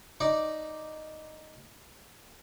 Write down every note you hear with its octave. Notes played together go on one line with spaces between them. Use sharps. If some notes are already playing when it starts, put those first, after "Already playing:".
D#4 D5 D6